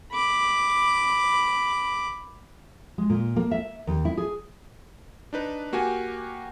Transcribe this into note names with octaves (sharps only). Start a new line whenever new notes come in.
B5 D6
G#3
A#2
A#3
E5
D#2
E4
G#4
D4 D#4 B4
A#3 F#4 G4 G#5